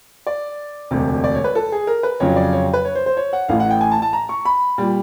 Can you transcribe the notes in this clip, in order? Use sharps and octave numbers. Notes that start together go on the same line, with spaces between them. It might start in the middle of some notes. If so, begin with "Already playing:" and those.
D5
E1 D2 C3
D5
C#5
B4
A4
G#4
A#4
B4
F2 C#3 F#3 C#5
D5
C#5
B4
C#5
C5
C5
C#5
F#5
A1 A2 E3 F5
F#5
G5
G#5
A5
A5
A#5
C#6
B5
A#2 G3